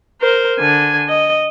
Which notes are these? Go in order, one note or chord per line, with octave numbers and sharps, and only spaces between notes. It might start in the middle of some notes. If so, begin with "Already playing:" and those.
A#4 C5
D3 G#5
D#5